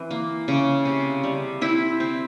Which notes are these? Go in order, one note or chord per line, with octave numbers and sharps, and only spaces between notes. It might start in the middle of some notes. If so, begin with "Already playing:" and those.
Already playing: E3 C4
A#3
C#3
C3
G3
C4 E4
C4